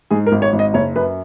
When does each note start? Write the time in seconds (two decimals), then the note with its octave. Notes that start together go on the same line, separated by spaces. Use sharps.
0.10 G#2 G#4
0.26 A#4
0.32 G#1
0.42 C#5
0.53 G#1
0.59 D#5
0.74 F#1 C#5
0.96 F#2 B4